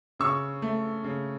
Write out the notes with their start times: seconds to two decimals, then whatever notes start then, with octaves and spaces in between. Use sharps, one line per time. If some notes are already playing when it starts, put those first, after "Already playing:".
0.19 C#3 C#6 E6
0.62 A3
1.04 C#3